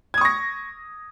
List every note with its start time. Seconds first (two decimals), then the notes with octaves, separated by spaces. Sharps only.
0.14 G#6
0.18 D#6
0.21 C#6
0.25 A#6